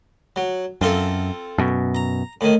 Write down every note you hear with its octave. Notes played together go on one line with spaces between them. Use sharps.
F#3
F#2 C4 F4 A4
F#2 B2
A#5
A2 D#3